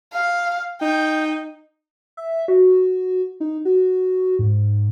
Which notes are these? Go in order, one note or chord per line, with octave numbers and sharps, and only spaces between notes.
F5
D#4 G5
E5
F#4
D#4
F#4
G#2